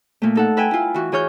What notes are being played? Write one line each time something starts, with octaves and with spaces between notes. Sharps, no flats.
A#2 A3
D#4 A4 F#5
B4 E5 G5 G#5
E4 F4
E3 F#4
E3 G#4 C#5 F6 G6